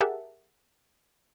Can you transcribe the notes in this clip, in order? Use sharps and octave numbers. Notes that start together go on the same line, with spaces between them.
G4 G#4 A#4 E5 F#5 A5